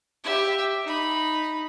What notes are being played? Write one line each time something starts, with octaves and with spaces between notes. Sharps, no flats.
G4 E5
D#4 B5